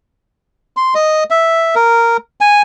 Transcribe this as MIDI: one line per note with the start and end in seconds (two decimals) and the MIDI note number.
0.77 0.94 84
0.95 1.24 75
1.30 1.75 76
1.75 2.17 70
2.41 2.62 80